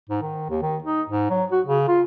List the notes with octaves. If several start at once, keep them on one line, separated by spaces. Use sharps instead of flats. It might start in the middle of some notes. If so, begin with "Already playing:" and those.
G#2
D#3
D#2
D#3
D#4
G#2
F#3
F#4
C#3
F4